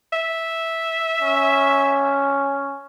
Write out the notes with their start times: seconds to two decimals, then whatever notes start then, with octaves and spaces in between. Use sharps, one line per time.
0.13 E5
1.22 C#4